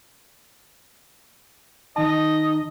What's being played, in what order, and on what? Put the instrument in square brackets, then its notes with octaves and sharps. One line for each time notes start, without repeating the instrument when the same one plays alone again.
[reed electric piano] D#3 A5 [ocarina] D#4 [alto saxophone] D#5